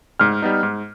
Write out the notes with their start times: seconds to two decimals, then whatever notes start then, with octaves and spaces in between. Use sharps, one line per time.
0.19 G#2 F6
0.42 G3 B3 D#4
0.63 G#2